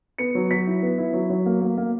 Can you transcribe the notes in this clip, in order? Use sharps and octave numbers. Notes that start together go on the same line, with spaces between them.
B3 C#7
F#3
F#3 B6
E4
B3
E4
F#3
F#3
A#3
A#3
A#3